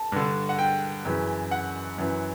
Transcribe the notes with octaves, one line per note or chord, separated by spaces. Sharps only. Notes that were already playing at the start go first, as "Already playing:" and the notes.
Already playing: A5
G2 D3
F#5
G5
F#2 C#3 E3
F#5
F#2 E3